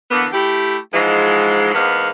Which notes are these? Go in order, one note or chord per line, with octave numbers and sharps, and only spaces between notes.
D3 E3 A#3 B3
A3 E4 G4
G#2 E3 F3 G#3
E2 G#2 A#3 B3 F5